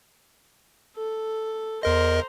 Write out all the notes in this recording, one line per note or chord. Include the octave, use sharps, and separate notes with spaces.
A4
E2 A#4 C5 D#5 A#5